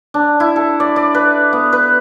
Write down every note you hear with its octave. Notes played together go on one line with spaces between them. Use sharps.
D4
E4
A4
D5
D5
B4
B3
B4